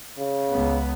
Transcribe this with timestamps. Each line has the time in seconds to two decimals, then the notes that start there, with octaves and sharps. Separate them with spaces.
0.19 C#3
0.51 C#2 B3